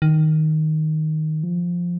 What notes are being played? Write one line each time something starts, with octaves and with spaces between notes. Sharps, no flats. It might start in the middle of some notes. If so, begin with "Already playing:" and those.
D#3
F3